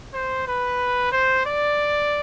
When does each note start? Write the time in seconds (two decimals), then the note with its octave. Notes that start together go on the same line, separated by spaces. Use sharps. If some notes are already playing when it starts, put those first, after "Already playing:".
0.13 C5
0.46 B4
1.12 C5
1.46 D5